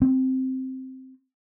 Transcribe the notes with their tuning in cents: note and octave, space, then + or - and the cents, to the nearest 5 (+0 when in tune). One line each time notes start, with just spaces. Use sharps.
C4 +0